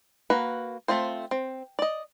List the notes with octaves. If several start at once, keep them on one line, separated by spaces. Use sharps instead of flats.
A#3 F#4 B4
A3 C4 F4 C5
C4
D5 D#5